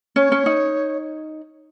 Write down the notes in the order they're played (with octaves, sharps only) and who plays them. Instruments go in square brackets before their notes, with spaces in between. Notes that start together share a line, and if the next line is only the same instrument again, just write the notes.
[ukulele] C#4 [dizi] C#5
[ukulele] C#4
D#4